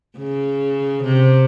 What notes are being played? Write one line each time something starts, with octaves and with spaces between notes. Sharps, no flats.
C#3
C3